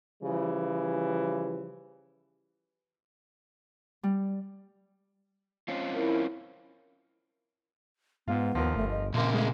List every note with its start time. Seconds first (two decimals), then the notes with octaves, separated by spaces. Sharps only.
0.23 C#3 E3 F3 G3
4.03 G3
5.68 C4 C#4 F4
5.94 E4 A#4
8.28 G#2 B3 F4
8.55 D#2 F3 A#4
8.76 G1 A3
8.90 D#5
9.14 A#1 A#2 C#3 A#3 C6
9.34 G#3 A3